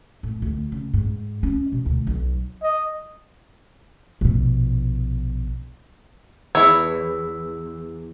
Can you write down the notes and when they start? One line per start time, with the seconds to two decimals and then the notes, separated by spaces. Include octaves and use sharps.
0.23 A2
0.42 D2
0.72 C#3
0.94 G#2
1.43 C#4
1.72 B2
1.86 D2
2.07 B1
2.63 D#5
4.21 A#1 B2
6.55 E2 E4 C#5 E6